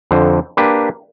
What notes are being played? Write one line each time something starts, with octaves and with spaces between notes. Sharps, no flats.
F2 D3 C5
A#3 D4 G4 B4